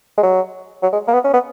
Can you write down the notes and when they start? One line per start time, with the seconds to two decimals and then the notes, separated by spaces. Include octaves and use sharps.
0.18 G#3
0.23 F#3
0.83 F#3
0.93 G#3
1.08 A#3
1.14 B3
1.24 C#4
1.34 B3